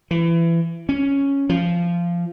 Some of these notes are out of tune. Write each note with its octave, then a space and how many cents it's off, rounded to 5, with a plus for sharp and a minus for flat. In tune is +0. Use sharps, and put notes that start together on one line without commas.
E3 +25
C#4 +0
F3 -15